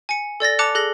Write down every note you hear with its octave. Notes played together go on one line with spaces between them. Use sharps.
G#5 C#7
A4 D5 A6 A#6
A5 D6 F#6 C#7 F7
G#4 A4 F#6 A#6